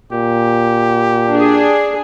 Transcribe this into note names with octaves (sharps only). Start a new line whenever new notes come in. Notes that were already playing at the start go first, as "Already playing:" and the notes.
A#2 G4
D4 G#4